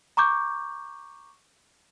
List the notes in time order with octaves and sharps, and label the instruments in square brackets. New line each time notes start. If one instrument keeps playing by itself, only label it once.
[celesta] A#5 C#6 D6 G6